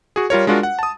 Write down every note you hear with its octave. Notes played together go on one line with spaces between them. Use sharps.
F#4 G#4
G3 F4 A#4 C#5
G#3 D4 F4 F#4 A#4
F#5
A5 D#6